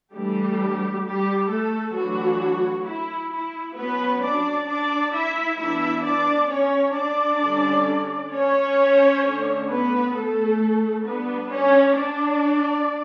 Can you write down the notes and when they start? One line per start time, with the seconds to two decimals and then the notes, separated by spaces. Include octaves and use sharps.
0.13 E3 G3 A3 D4 G4
1.04 G3 G4
1.50 A3 A4
1.95 E3 F#3 A3 D4 F#4
2.86 E4
3.32 E4
3.77 F#3 B3 C#4 B4
4.22 D4 D5
4.68 D4 D5
5.13 E4 E5
5.59 E3 B3 D4 E4 E5
6.04 D4 D5
6.50 C#4 C#5
6.96 D4 D5
7.41 D3 G3 C#4
8.32 C#4 C#5
9.22 D3 A3 D4
9.69 B3 B4
10.13 A3 A4
11.05 G3 B3 D4 B4
11.50 C#4 C#5
11.95 D4 D5